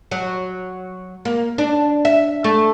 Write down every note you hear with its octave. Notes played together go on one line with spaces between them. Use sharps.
F#3
A#3
D4
E5
A3